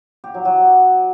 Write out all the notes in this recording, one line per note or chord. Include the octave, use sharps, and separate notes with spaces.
G4
F#3
F#3